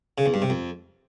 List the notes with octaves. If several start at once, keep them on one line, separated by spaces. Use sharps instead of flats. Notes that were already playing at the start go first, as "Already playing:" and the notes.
C#3
E2
G2
C3
F2